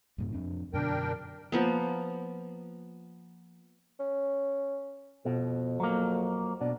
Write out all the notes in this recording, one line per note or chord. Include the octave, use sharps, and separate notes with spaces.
F#2 A2 C3
F2 C4 D4
F#2 B2 D3 D4 A#4 G5
F3 A#3 B3
C#4
F2 B2
F#3 A#3
B2 D4